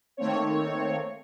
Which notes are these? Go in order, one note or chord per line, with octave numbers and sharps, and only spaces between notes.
D#3 A3 A#3 C4 C#5